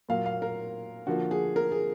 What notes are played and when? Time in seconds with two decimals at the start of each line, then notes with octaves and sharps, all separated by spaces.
0.09 A#2 F#3 A#3 F5
0.26 F5
0.42 A#4
1.07 D3 F3 A#3 F#4
1.31 G#4
1.56 A#4
1.72 G#4